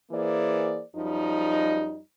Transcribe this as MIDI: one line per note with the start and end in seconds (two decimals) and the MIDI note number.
0.11 0.81 52
0.11 0.81 58
0.11 0.81 68
0.11 0.81 72
0.11 0.81 74
0.95 1.98 42
0.95 1.98 53
0.95 1.98 55
0.95 1.98 63